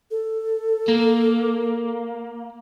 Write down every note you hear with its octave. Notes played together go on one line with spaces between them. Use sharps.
A4
A#3